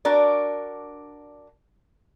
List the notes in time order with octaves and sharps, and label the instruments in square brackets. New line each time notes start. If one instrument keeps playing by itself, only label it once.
[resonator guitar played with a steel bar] D4 F#4 A#4 D5